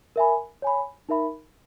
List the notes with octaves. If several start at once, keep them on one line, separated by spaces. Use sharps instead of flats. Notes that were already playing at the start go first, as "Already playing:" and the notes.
A#4 E5 G#5 B5
C#5 G#5 B5
D#4 A#4 E5 B5